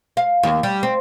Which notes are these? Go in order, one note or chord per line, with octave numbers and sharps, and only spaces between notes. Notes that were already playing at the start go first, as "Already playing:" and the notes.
F5
D#2
G3
C4